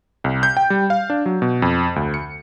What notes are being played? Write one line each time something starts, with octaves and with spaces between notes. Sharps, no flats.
C2
G6
G5
G3
F5
D4
F#3
B2
F2
D2
C#7